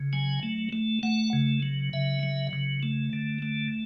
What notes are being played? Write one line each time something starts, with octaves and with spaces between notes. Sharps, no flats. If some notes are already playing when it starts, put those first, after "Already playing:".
Already playing: C#3
F#3 G#5
A3
A3
A3 F#5
C#3
F#3
C#3 E5
F#3
C#3
A3
D3
A3